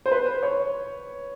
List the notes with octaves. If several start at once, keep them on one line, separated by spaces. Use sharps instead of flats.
C5
B4
C#5